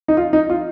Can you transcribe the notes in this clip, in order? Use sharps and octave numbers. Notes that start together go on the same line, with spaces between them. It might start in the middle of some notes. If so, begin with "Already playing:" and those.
D#4
F4
D#4
F4